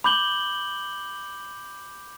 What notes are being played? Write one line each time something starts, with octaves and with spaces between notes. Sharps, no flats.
B5 D6 G6 F#7 G7